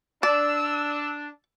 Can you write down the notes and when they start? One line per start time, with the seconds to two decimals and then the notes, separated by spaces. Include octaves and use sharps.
0.23 D4 D5 E6